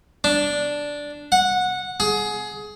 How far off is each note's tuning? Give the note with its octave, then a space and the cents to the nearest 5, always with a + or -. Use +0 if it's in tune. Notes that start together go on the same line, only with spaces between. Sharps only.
D4 -5
F#5 -15
G#4 +20